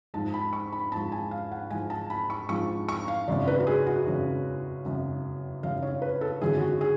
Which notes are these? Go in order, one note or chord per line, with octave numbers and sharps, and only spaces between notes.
G#2 F3 G#3 A5
B5
C#6
B5
G#2 F3 G#3 A5
G#5
F5
F#5
G#2 F3 G#3 G#5
A5
B5
C#6
G#2 F3 G#3 C#6
C#6
F5
G#1 F#2 C#3 D5
B4
F#4
G#4
F#4
G#1 F#2 C#3
G#1 F#2 C#3
G#1 F#2 C#3 F5
C#5
B4
A4
G#1 F#2 D3 F#3 G#4
F#4
G#4